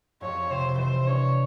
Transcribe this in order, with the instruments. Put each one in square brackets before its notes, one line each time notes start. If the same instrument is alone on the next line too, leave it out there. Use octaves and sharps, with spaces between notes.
[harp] F2 [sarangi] C#5
[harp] C3 [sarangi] C5
[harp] E3 [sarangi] C5
[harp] D4 [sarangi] C#5